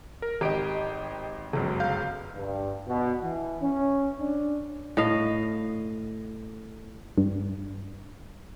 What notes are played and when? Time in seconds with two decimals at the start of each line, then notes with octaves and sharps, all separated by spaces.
0.22 A#4
0.41 G#1 G4 D#5 D7
1.53 G1 C#2 F#2
1.80 F5 G6
2.35 G2
2.86 B2
3.23 E3
3.61 C#4
4.20 D4
4.97 A2 D#5 F5
7.18 G2